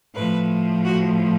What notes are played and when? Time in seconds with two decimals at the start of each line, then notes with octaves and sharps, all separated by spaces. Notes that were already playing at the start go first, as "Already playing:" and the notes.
0.14 A2 F3 B4
0.84 F#4